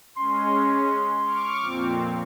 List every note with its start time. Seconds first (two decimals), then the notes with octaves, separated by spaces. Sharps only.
0.16 G#3 C#4 C6
1.25 C#6 D6 F6
1.61 F2 A#2 C4